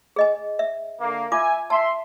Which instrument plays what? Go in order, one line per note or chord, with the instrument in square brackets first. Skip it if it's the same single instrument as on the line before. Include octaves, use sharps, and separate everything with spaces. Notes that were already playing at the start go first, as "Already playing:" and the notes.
[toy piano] G#4 D#5 G#5
E5
[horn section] D3 A#3
[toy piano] F4 D6 [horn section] E5 G#5
[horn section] E5 C6 [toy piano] A5